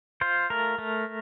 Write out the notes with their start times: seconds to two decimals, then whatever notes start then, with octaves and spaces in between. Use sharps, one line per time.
0.21 F4 C5
0.50 A3 A#4
0.78 A3